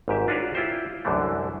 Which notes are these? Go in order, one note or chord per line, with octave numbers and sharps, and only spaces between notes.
G#1 G#2 G4 E5
D4 F4 F#4 B4 C#5 D5
E4 F4 G4 C5
C2 F#2 D3 E3 A3